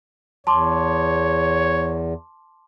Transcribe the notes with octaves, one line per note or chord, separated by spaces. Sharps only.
E2 C#5 A5 C6 D6